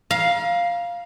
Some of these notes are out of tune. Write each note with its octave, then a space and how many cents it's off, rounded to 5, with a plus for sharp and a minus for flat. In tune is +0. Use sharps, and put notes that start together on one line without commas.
F5 +0 A#5 +35